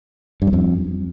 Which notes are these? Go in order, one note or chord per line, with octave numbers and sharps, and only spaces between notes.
G2
F#2
F2